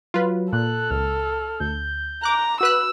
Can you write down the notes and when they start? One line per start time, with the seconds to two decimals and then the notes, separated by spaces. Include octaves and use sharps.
0.14 F#3 F4 B4
0.53 A#2 A4 F#6
0.91 C#2 F6
1.60 D2 G6
2.23 A#5 D6 F#6
2.61 F#4 B4 E6 F#6